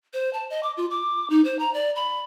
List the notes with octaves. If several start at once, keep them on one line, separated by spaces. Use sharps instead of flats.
C5
A5
D#5
D6
F4
D6
D#4
C5
A#5
D5
B5